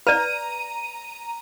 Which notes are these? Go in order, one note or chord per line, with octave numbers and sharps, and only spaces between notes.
B4 D5 A#5 D#7